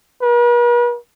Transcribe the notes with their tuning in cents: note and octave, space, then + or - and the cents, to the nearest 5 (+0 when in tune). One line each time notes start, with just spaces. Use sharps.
B4 -45